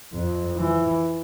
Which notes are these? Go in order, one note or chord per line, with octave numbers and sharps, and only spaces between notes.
F2
E3